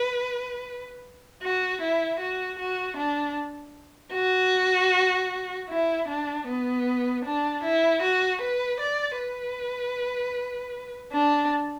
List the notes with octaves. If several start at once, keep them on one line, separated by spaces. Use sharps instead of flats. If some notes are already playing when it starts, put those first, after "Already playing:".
Already playing: B4
F#4
E4
F#4
F#4
D4
F#4
E4
D4
B3
D4
E4
F#4
B4
D5
B4
D4